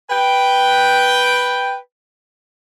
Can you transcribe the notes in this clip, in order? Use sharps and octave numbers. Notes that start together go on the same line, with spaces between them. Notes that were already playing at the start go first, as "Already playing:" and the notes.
B4 G5